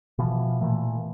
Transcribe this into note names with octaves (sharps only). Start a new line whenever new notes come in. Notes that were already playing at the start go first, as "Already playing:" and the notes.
B2 E3 F3
A#2 E3 A3